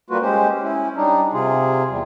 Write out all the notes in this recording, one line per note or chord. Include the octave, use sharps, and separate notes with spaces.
G3 A#3 F4 F#4 B4
G#3 C#4 G4 C5
C#4 E4
G3 D4 D#4
C3 F4 G#4
E2 G3